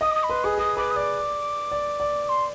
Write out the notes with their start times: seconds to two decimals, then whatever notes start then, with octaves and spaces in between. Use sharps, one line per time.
0.01 D#5 D#6
0.11 D6
0.15 D#6
0.23 B5
0.29 B4 C6
0.44 G#4 D#6
0.58 G#4 D#6
0.77 B4 D6
0.91 D#6
0.96 D5 D6
1.71 D5
2.00 D5
2.29 C6